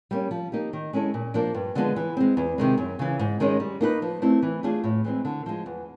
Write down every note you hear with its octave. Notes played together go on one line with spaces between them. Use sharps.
G3 A#3 C#4
F3
A#3 D#4 G4
D#3
G#3 C#4 E4 A4
A#2
F3 A#3 D4
G2
D3 F3 G#3 B3
E3
G#3 C4
E2
C3 D#3 G#3
F#2
C#3 E3
G#2
D#3 G#3 C#4
G3
A#3 D#4 G4 B4
F3
A3 C4 E4
E3
A3 D4 F4 G#4
A2
E3 G#3 C4
D3
F3 G#3
E2